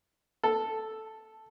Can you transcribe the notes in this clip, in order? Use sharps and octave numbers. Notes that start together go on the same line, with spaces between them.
A4